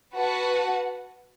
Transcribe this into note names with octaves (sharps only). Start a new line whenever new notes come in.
F#4 B4 F#5 A5